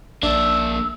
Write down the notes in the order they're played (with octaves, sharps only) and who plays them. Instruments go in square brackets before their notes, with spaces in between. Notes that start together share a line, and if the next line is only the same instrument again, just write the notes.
[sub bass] A#1 [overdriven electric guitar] A#3 E5 [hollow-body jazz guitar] D4 [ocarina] E6